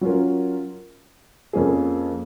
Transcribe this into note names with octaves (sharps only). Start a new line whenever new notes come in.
F#3 C#4 F4 A#4
F2 F3 A#3 C#4 G#4